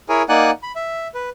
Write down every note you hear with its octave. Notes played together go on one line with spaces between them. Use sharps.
E4 G#4 A#4 C#5 G#5
A#3 D#4 D5 F#5 G#5 F#6
B5
E5
B4